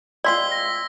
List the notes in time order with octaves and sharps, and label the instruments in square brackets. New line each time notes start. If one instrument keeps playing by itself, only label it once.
[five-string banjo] G#3 C4 F4 [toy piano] D5 C6 [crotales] E6 B6 G7
[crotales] A#6